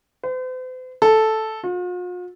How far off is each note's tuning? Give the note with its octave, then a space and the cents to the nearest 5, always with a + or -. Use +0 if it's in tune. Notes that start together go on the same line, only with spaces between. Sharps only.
C5 -45
A4 -5
F4 +45